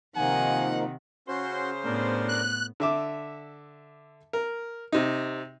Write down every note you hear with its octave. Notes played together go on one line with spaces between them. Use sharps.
C3 D#3 F3 A#3 D#4 F#5 G#5
C#3 C#4 F#4 C5 C6
A2 B3 D4 A#4
F#6
D3 E5 D6
A#4
C3 D#4